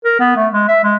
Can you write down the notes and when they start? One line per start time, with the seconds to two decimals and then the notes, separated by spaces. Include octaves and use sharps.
0.04 A#4
0.20 B3
0.36 A3
0.53 G#3
0.68 E5
0.84 G#3